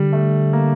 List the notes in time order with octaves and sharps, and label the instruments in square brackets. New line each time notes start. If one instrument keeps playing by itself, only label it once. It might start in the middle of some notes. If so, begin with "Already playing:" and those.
Already playing: [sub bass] D3 [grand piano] G3
[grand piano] A3
A#3